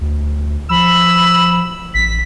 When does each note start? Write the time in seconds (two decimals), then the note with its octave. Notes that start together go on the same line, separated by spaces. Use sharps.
0.01 D2
0.70 F3 B5 E6
1.94 A1 B6